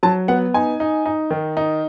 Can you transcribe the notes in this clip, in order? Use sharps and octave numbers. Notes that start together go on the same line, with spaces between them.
F#3 A5
B3 F#5
D#4 G#5
D#4
D#4
D#3
D#4